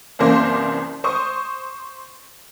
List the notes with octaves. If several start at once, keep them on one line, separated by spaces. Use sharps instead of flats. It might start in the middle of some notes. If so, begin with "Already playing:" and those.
C2 F#2 E3 A#3 C5 D6
C5 C#6 D#6